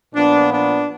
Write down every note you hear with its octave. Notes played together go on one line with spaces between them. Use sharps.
A#2 F3 B3 D4
D4